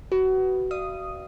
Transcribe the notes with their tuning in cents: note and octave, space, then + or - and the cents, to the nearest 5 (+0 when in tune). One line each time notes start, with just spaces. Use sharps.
F#4 +25 B4 +5
D5 +35 F5 -35 D#6 +0